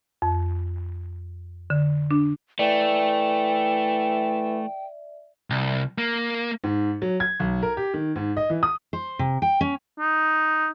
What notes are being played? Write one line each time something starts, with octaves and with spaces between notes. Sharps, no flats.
F2
D3
D4
E3 A3 D5 E5 G5
C2
A#3
G#2
F#3
G#6
B1
A#4
G4
D#3
G#2
D#5
E3
D#6
C5
C3
G5
C#4
D#4